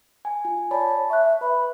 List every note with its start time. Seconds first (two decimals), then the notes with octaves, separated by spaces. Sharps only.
0.25 G#5
0.45 F4 G#5
0.71 C#5 D5 A5 B5
1.10 E5 C#6 F#6
1.41 B4 B5